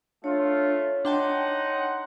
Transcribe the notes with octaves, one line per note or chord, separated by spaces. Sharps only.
A3 D4 F4 C#5
D4 D#4 F#5 G5 A5 C6